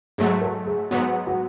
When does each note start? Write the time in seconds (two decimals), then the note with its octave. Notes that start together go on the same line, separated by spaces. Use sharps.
0.18 G#2 F#3 A3 G#4
0.42 A4
0.66 G#4
0.91 G#2 F#3 B3 F#4
1.27 F#4